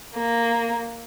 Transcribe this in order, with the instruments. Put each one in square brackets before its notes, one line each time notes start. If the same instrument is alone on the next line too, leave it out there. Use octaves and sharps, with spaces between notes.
[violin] A#3